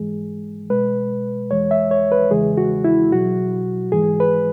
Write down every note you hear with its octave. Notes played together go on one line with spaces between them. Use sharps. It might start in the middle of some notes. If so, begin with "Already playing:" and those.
Already playing: G#2 E3 G#3 G#4
B2 G#3 B4
E2 E3 G#3 C#5
E5
C#5
B4
E2 C#3 E3 G#3 G#4
F#4
E4
B2 F#3 F#4
G#2 E3 G#3 G#4
B4